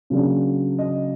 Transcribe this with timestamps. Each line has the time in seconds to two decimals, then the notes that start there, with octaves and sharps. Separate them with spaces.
0.10 C#3 F#3 A#3 D4
0.79 D#5